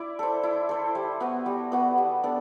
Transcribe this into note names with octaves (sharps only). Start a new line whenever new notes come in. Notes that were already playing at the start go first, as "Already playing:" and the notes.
Already playing: E4 D5
A4 C5
E4
A4 C5
G3
B3 F#4 B4
G3
B3 F#4 B4
G3
B3 D4 A4